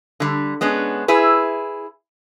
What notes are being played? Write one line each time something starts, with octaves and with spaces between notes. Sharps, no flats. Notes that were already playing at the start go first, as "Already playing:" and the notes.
D3 G3
G#3 B3 C#4 D4
E4 G#4 B4